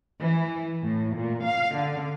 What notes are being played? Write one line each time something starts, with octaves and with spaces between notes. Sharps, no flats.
E3
A2
A#2
F5
D3